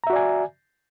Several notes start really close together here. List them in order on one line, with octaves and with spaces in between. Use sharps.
A#5 E5 F#4 D5 G#5